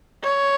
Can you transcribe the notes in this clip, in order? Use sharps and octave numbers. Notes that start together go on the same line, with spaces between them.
C#5